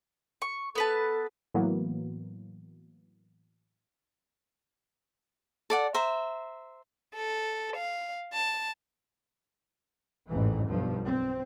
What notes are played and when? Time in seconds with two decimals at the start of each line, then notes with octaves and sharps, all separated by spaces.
0.42 C#6
0.75 B3 A4 B4 A5
1.54 A2 E3 F#3 A#3 B3
5.70 A4 D5 F#5
5.94 C5 E5 A#5
7.14 A4
7.76 F5
8.33 A5
10.28 A1 F2 G#2 E3
10.68 B1 G2 F3
11.05 C4